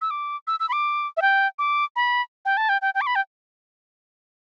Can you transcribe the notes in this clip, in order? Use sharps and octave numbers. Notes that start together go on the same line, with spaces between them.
E6
D6
E6
E6
B5
D6
E5
G5
D6
B5
G5
A5
G5
G5
G5
D6
B5
G5